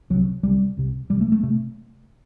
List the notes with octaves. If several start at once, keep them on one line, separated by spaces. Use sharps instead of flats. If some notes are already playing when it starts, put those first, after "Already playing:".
C2 C3 F#3
C2 C3 G3
C2 C3
C2 C3 G3
A3
A3
C3 A3